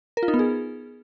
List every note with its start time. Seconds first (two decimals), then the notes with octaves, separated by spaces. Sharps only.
0.17 A#4
0.23 F4
0.28 D#4
0.34 B3
0.39 G#4